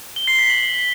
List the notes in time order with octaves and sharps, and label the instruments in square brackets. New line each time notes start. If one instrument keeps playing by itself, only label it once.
[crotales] G7
C7
B6
F#7